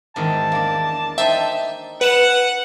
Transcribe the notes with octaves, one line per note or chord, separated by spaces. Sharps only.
E2 G#2 D#3 A5
A#3 D4
D#4 C5 E5 G5
B4 F#5 E7